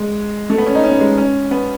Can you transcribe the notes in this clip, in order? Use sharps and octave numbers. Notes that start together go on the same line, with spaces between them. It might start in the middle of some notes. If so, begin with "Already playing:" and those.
Already playing: G#3
A3
B3
C#4
D#4
C#4
B3
G#3
C#4
B3